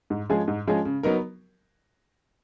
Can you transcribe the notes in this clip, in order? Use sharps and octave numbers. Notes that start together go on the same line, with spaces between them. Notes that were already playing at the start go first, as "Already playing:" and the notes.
G#2
F3 G#3 C#4 G#4
G#2
F3 G#3 C#4 G#4
C#3
F#3 B3 D#4 A#4